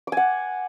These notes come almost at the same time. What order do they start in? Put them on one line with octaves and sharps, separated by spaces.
D6 G#5 F#5